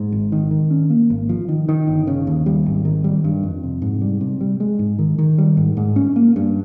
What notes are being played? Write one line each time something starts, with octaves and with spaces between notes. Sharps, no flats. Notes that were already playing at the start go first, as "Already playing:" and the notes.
Already playing: G#2
G#1
D#3
D#3
C#4
A#3
G#1
F3
D#3
D#3
G1
C#3
D#2
G3
G#1
D#3
G3
G2
F2
C3
G#2
G3
C3
G3
G#3
G#2
D#3
D#3
G3
G#2
G#2
C#4
A#3
G2